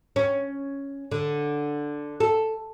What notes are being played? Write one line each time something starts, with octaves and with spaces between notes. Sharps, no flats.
C#4
D3
A4